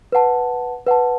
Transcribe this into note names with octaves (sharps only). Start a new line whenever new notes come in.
B4 F#5 A5
B4 F#5 A5